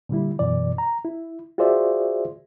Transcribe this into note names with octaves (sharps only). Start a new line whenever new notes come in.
A#2 D3 G3 E4
F#2 B2 E3 D5
A#5
E4
F4 F#4 G#4 C5 D5 E5